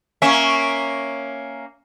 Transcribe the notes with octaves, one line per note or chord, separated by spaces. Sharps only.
A#3 C#4 E5